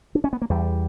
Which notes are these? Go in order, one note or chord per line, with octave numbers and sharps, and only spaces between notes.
D4
C#4
B3
A#3
E2 G3